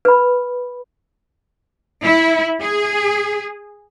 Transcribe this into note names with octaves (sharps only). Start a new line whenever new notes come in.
B4 B5
E4
G#4